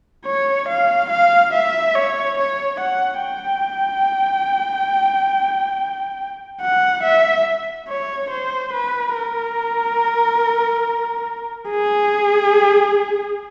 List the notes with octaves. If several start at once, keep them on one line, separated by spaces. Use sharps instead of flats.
C#5
F5
F5
E5
C#5
C#5
F#5
G5
F#5
E5
C#5
C5
B4
A#4
G#4